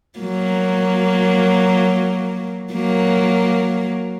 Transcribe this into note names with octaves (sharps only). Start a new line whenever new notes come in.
F#3 A#3
F#3 A#3